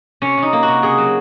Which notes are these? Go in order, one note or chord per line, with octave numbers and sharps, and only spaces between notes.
C3 C#4
C3 D#4
A#3
F#4
C3
C#3 G#4
F#3